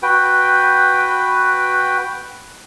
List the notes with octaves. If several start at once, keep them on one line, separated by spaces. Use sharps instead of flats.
F#4 B4 G5